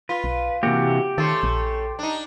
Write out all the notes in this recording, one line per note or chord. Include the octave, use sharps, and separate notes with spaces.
F4 B4
B1
C3 E3 A#3 F#4 G4
D#3 A3 C#4 A4 C5
A#1
D4 D#4